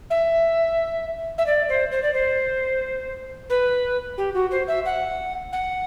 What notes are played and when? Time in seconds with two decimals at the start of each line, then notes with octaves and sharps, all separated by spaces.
0.10 E5
1.37 E5
1.46 D5
1.68 C5
1.91 C5
2.02 D5
2.13 C5
3.49 B4
4.17 G4
4.34 F#4
4.51 C5
4.67 E5
4.85 F#5
5.52 F#5